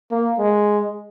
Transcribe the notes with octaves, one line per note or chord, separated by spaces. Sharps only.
A#3
G#3